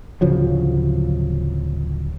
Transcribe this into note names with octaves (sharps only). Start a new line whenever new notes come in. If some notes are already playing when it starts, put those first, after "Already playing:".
D1 C#3 F3 F#3